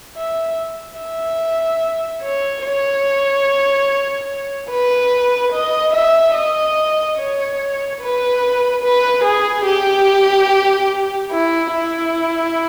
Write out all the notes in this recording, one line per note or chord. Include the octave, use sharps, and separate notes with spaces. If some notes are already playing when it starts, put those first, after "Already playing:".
E5
E5
C#5
C#5
B4
D#5
E5
D#5
C#5
B4
B4
G#4
G4
E4
E4